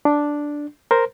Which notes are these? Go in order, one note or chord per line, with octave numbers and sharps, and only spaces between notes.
D4
A#4 C5